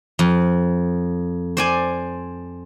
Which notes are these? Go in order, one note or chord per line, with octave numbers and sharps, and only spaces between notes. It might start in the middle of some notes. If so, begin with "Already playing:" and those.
F2
C5 D5 G#5